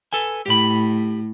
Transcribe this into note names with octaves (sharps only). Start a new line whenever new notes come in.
A4 B4 G#5
A2 G4 B5